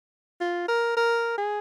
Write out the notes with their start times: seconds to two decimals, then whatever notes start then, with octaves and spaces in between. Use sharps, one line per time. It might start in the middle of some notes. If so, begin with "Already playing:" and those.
0.41 F4
0.68 A#4
0.97 A#4
1.38 G#4